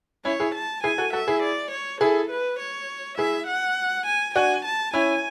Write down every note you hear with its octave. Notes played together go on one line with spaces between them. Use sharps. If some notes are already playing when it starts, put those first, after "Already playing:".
C#4 E4 C#5
E4 G#4
A5
E4 G#4 G#5
F#4 A4
F#4 A4 E5
E4 G#4
D5
C#5
E4 G#4 A4
B4
C#5
E4 G#4 E5
F#5
G#5
D4 F#4 G#5
A5
C#4 E4 G#5